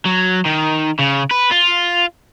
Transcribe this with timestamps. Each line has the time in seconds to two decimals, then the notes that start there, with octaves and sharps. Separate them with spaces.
0.05 F#3
0.46 D#3
0.99 C#3
1.31 B4
1.52 F4